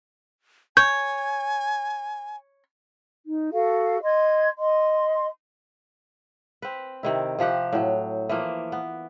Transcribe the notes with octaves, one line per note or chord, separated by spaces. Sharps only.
C#5 G#5 G6
D#4
F#4 A4 F5
D#5 C6 G#6
D#5 C6
C4 B4
C3 D#3 E4
C3 F3 G4 F#5
A2 F#3
E3 F3 A#3
B3